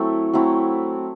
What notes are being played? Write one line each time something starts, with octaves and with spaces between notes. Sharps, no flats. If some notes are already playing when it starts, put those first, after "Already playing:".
Already playing: F#3 A3 C4 E4 A4
F#3 A3 C4 E4